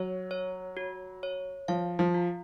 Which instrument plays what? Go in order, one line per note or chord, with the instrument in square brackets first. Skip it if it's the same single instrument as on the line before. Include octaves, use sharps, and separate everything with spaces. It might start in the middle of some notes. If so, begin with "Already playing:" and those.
Already playing: [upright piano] F#3 [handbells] C#5
[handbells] C#5
F#4
C#5
[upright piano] F3 [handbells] F5
[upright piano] F3
[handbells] F4